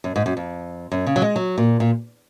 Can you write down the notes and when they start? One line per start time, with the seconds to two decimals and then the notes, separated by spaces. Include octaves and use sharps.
0.04 F#2
0.16 G#2
0.26 F#2
0.37 F2
0.92 F#2
1.06 C#3
1.16 F#3
1.22 G#3
1.36 F#3
1.58 A#2
1.80 A#2